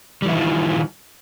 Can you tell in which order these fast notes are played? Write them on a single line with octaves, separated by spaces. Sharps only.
G3 E3 E4 D#3 F4